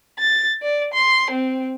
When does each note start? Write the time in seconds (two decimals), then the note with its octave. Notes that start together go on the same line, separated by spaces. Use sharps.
0.19 A6
0.62 D5
0.94 C6
1.31 C4